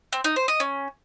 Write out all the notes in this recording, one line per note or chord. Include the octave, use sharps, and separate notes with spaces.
C4
D#4
C5
D#5
C#4